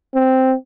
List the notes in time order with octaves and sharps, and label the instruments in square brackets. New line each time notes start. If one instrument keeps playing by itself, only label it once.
[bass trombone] C4